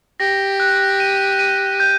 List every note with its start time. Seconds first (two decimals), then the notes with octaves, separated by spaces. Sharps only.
0.20 G4 A#6
0.60 F#6
1.00 D#7
1.39 D#7
1.80 G6